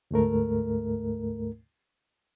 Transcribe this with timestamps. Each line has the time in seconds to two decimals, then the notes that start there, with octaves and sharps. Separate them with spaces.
0.11 D2 G#2 A3 A#4